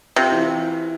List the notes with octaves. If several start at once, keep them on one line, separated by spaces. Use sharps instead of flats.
C3 F4
E3